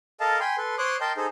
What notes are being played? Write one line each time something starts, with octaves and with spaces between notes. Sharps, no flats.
A4 A#4 D#5 F5 A5
G5 G#5 B5 C6
A4 B4 C6
C5 C#5 C6 D6 D#6 F#6
A#4 D#5 G5 A5 C6 G6
D#4 G#4 A4 C5 D#5